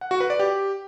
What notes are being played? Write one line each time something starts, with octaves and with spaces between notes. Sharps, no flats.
F#5
F#4
B4
D5
G4